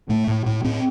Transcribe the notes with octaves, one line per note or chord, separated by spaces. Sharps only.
A2 A3
A2
A2
A2 C4